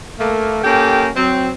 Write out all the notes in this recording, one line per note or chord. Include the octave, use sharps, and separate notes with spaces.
A3 A#3
A#3 C#4 G4 A4 G5
F#3 C4